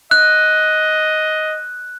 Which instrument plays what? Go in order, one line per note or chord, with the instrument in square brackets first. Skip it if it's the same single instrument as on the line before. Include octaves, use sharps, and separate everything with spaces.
[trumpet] D#5 [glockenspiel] F#6